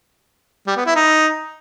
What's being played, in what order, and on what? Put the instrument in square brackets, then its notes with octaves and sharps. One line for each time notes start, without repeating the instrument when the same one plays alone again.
[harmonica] G3
B3
E4
D#4